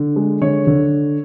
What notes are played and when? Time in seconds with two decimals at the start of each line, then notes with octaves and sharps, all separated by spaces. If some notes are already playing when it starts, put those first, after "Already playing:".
Already playing: D3
0.16 G#3
0.41 D3 C#5
0.67 D3